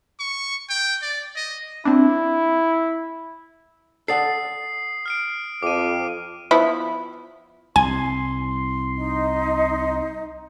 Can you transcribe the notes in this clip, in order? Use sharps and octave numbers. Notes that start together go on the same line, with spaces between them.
C#6
G5
D5
D#5
C4 D4 E4
A4 D5 F#5 D#6 C7
F6 C7 D7
F2 D6 D#7
F3 B3 E4
C2 G#5 C6
D#4 D#5